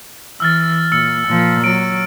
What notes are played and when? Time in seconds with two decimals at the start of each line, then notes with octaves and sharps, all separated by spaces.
0.40 E3 E6 F6 A6
0.92 A#2 E6 C#7
1.27 A#2 F3
1.64 F#3 D7